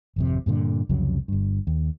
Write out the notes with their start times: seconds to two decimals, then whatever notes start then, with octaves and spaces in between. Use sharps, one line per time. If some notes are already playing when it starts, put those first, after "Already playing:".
0.16 G#1 F2 C3
0.46 G2 A#2 D3
0.89 C2 F2 C#3 F#3
1.28 G1 G2
1.67 D#2